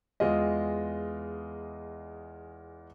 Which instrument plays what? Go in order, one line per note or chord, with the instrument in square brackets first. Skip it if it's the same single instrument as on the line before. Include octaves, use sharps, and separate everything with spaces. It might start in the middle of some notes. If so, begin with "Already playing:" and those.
[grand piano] E2 G#3 F4 D#5